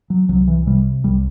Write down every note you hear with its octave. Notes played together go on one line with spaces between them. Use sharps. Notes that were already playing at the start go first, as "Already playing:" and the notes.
F#3
C2 F#3
E3
C3 G3
C2 G3